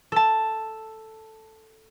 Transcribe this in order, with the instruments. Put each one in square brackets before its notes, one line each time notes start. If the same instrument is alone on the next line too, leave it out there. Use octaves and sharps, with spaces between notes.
[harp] A4 A5